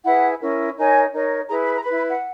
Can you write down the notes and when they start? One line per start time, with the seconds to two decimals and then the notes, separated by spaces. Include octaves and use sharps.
0.05 E4 G#4 B4 F#5
0.41 C#4 E4 A#4 C#5
0.77 D#4 A#4 C#5 G#5
1.13 D#4 A#4 C#5
1.48 E4 G#4 B4 A#5
1.65 B5
1.74 A#5
1.84 E4 B4 B5
1.95 B5
2.08 F#5